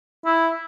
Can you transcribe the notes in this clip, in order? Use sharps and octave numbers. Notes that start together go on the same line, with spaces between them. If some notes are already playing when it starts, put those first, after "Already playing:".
E4